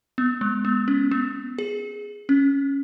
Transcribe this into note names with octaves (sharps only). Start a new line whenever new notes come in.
B3
G#3
B3
C#4
B3
G#4
C#4